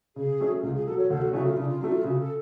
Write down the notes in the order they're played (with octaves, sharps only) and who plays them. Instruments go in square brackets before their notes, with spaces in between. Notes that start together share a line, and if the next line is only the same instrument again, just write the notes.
[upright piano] C#3 [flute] G#4
[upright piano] F#3 A3 C#4
[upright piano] C#2 [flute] F4
[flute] G#4
[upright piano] B2 F#3 [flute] A4
[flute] C#5
[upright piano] D2 [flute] A4
[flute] F#4
[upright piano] C#3 F#3 A3 C#4 [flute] F#4
[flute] F4
[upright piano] C#3 [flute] D4
[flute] F4
[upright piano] F#3 A3 [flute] D4
[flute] F4
[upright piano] C#3 [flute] F#4
[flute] A4